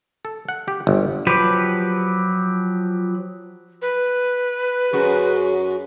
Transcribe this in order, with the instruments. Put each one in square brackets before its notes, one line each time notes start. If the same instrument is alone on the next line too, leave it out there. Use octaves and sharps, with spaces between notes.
[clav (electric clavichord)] A4
F#5
G4
G1
[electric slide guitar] F3 F#3 G4 B4
[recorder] B4
[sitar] F#2 F#4 [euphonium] G#4